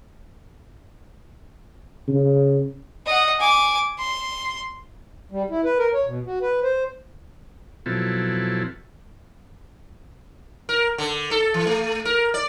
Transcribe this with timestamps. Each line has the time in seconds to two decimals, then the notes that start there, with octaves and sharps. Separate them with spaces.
2.08 C#3
3.06 D#5 F#5
3.40 G#5 D6
3.99 C6
5.31 G3
5.50 E4
5.65 B4
5.79 A#4
5.94 C#5
6.06 B2
6.26 F#4
6.41 B4
6.63 C5
7.86 B2 F3 F#3 C4 E4 A4
10.69 A#4
10.98 D3
11.31 A4
11.54 E3
11.67 A3
12.05 A#4
12.34 D5